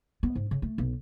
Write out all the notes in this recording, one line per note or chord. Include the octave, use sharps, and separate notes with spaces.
B3
G#2
C#3
A3
B1